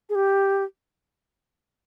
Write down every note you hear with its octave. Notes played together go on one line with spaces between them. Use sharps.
G#4
G4